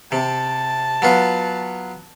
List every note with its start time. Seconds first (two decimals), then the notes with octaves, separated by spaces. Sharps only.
0.12 C3 A5
1.02 F#3 B3 F4